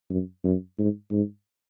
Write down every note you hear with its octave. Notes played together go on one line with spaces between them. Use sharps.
F#2
F#2
G#2
G#2